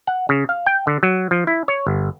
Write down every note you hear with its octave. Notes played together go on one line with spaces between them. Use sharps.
F#5
C#3
F5
G5
D3
F#3
F3
E4
C#5
G1